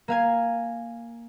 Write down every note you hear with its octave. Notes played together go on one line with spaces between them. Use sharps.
A#3 F5 G#5